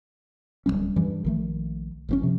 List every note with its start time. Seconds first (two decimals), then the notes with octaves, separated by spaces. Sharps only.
0.66 D1 G2 G3 C#4
0.96 G2 E3
1.25 A#1 D#3 A3
2.09 G1 C3 C#4
2.22 C3 F3